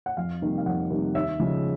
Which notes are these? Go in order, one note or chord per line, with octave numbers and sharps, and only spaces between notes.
F#5
F2 F5
C3 D#3 G3 A#3
F5
F2 F#5
C3 D#3 G3 A#3
D#2 E5
C#3 F3 G#3